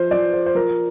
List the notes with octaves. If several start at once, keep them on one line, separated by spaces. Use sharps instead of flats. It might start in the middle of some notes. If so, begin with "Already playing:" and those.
Already playing: F3 C5
F3 D5
C5
C5
F3 A#4